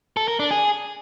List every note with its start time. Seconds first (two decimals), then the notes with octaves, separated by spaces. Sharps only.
0.17 A4
0.28 A#4
0.39 D4
0.51 G#4